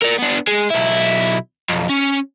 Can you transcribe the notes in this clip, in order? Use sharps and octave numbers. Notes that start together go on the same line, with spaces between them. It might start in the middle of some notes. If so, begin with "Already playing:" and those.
A#4 D5
B3 D4
G#3
B1 E4
B1 F2
C#4